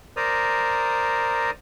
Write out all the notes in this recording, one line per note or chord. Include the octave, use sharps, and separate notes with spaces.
A#4 C5 D5 A#5 D#6